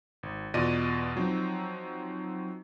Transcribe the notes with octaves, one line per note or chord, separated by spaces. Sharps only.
G#1
E2 B2 F4 D5 D#5 D#7
F3 F#3 C4 D#4